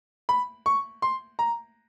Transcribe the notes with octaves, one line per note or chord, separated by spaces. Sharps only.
B5
C#6
C6
A#5